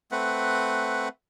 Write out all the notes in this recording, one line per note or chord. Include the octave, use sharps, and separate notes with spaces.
A3 C4 B4 F#5